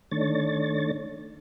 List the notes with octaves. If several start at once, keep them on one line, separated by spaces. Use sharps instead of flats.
D#3 A3 D4 C#5 A6